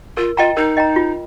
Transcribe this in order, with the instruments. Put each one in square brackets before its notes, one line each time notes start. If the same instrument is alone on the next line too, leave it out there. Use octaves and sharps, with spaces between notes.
[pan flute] F4 [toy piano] A#4
[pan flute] F4 [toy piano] D#5 G5 A#5
[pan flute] D#4 [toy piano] A#4
[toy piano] D#5 G5 A#5
F4